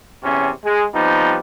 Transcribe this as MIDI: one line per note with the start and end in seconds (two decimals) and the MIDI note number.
0.23 0.50 40
0.23 0.50 48
0.23 0.50 61
0.65 0.85 56
0.94 1.37 53
0.94 1.37 55
0.94 1.37 59
0.94 1.37 60
0.94 1.37 63